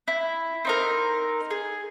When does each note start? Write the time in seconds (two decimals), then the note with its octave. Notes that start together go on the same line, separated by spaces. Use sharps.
0.08 E4
0.65 C4 D#4 A#4
1.51 G#4